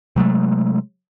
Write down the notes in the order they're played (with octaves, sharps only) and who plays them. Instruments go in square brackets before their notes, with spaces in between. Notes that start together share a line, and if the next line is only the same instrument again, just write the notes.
[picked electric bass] C3 F#3 G#3 A3